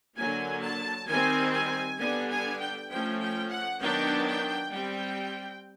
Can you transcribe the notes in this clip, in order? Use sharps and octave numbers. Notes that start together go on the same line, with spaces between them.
D3 F#3 A#3 G#5
A5
D#3 G3 C4 G#5
G#5
D3 G3 B3 D4 G#5
G#5
G5
F3 A3 C#4 G5
G5
F#5
D#3 F#3 B3 D4 G5
G5
G3 C4 G5